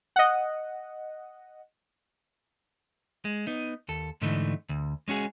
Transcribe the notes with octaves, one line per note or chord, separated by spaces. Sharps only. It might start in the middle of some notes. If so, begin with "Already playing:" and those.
D#5 F#5
G#3
B3 D#4
D#2 A4
G#2 D3 E3 A3 D#4
D2
G#3 C#4 F#4 G#4